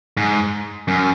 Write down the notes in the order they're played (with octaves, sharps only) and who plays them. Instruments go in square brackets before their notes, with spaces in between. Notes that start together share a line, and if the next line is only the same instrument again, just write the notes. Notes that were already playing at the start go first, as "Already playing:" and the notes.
[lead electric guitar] G#2
F#2